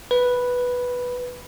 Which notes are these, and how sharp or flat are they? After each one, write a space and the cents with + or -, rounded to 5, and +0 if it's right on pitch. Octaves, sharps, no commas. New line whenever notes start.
B4 -5